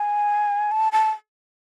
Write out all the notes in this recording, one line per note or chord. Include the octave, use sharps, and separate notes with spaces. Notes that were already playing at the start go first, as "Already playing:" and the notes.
Already playing: G#5
A5
A5